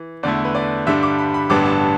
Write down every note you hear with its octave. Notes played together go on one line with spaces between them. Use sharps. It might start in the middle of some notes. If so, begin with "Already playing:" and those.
Already playing: E3
E2 D3 A3 E4 D5
B4
D5
G2 D3 G3 D4 E5
D6
B5
B5
A1 G2 D3 B3 D4 D6
A5